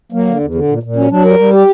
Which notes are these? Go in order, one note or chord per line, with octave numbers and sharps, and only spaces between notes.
F#3 A#3
D3
E2
D3
A#2
A#2
F#3 C#4
F#3 D4
G3 A#4
G3
G4